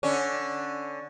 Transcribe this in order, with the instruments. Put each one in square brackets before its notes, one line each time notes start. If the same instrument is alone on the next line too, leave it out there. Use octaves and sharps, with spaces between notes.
[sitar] D3 C#4